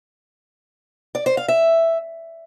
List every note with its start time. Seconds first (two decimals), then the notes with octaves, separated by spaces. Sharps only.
1.15 D5
1.26 C5
1.37 F5
1.48 E5